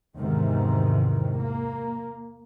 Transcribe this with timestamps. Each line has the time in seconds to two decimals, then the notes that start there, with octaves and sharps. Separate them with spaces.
0.19 E2 G#2 C3 D#3
1.42 A#3